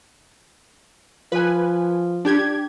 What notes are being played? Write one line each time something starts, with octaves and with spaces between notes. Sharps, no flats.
F3 B4 G#5
D4 G4 G#6